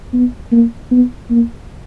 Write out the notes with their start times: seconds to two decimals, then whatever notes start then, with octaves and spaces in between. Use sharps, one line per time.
0.13 B3
0.52 A#3
0.91 B3
1.30 A#3